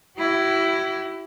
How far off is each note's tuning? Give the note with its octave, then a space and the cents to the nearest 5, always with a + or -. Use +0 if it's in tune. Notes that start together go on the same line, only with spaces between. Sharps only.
E4 +10 G4 -45